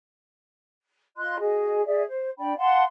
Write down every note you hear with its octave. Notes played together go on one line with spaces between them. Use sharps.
F4 D#5 C6 F#6
F#4 G#4 D#5
G#4 D5 E5
C5
D4 D5 G5 B5
F5 F#5 A5 C6